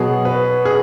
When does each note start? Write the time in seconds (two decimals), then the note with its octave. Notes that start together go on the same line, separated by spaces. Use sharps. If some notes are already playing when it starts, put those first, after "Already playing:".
Already playing: B2 F#3 B3 G#4
0.25 B4
0.65 G#4